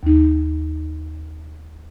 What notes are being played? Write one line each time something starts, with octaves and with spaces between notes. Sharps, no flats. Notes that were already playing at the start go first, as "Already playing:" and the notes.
D#2 D#4